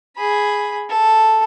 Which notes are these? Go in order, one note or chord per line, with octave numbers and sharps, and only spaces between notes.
G#4 B5
A4